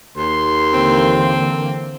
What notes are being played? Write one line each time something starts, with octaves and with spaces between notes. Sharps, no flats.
D#2 C6
D3 E3 A#3 C4